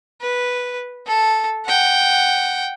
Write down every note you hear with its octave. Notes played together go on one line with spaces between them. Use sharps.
B4
A4
F#5 G5